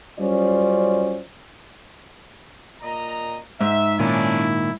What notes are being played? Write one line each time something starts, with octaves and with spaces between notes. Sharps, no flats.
F#2 G3 C#4 F4 C5 D5
A#2 D#5 A#5
G#2 E5
A#2 D#3 C#4 D4 E4